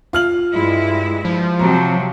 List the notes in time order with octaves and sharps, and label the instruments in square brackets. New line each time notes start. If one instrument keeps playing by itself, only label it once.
[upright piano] F4 F6 F#7
[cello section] G2 G#3 E4
[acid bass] F3
[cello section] C3 F#3 [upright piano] A#5